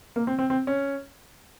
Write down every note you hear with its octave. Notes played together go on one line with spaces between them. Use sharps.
A#3
C4
C4
C4
C#4